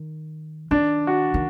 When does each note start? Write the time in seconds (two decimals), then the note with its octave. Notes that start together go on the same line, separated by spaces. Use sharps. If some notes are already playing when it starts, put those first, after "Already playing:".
Already playing: D#3
0.71 D#3 D4
1.07 F#4
1.34 D#3